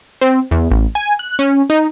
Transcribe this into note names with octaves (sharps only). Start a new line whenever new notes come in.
C4
E2
A1
G#5
F#6
C#4
D#4